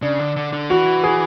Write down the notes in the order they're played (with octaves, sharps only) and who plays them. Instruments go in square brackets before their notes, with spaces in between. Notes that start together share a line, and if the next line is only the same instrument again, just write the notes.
[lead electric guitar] C#3 [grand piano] D4
[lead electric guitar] D3
D3
D3
[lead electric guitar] E3 [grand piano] F#4
[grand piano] G#4